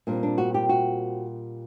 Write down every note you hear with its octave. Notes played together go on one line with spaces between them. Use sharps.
A#2 G3 C4 D4
D4
F#4
G4
F#4